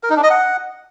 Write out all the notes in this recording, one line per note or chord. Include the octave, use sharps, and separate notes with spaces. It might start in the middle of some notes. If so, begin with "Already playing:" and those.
A#4
D#4
D4
D#5
F#5